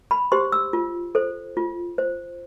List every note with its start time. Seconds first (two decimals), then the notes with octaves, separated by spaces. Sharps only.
0.11 B5
0.32 G4 C5 C6
0.52 E6
0.73 F4
1.15 A4 C5
1.57 F4
1.98 C5